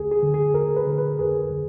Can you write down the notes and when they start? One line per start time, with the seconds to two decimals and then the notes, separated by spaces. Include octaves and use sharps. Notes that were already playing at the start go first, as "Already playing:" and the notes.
Already playing: D2 G#4
0.11 G#4
0.23 D3
0.34 G#4
0.54 D2 A#4
0.77 B4
0.87 D3
0.98 B4
1.19 F2 G#4
1.51 D3